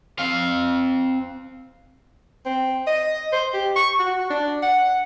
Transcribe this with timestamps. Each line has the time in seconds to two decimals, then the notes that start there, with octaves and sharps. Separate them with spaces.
0.19 C4 F5
2.45 C4
2.87 D#5
3.32 C5
3.54 G4
3.76 C#6
3.99 F#4
4.30 D4
4.63 F#5